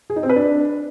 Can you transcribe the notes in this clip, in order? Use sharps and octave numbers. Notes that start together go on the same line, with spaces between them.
G#4
D#4
C4
B4
D4